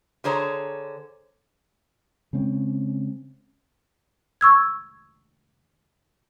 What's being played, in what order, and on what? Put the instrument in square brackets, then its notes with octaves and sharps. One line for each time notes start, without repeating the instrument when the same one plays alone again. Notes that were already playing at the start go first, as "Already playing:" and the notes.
[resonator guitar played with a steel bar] D3 G#4 C5 C#5 A#5
[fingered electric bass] C#3 G#3 C4 C#4
[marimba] C#6 E6 G#6